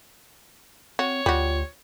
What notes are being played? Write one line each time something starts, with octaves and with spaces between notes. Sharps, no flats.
C4 F#4 C#5
D2 G3 F4 F#4